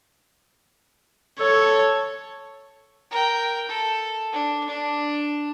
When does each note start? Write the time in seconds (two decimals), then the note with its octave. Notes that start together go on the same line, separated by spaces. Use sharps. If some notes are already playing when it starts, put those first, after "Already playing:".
1.40 A4 C#5
3.11 A#4 G5
3.69 A4
4.33 D4
4.68 D4